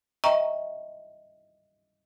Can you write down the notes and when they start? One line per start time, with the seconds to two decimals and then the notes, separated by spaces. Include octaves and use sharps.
0.24 D#5 E5 G5 A#5 C#6